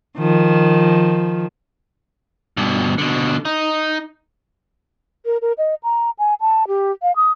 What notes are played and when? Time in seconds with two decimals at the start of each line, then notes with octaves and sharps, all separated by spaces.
0.18 D#3 F3
2.57 G2 B2
2.98 B2 D3
3.45 D#4
5.26 A#4
5.42 A#4
5.58 D#5
5.83 A#5
6.19 G#5
6.41 A5
6.68 G4
7.03 F5
7.16 D#6